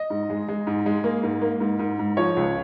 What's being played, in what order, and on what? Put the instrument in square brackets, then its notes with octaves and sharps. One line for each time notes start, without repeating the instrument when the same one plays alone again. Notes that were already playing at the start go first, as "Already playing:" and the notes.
Already playing: [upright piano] D#5
G#2
G#3
G#3
G#2
G#3
A#3
G#2
A#3
G#2
G#2
G#2
F3 C#5
C#2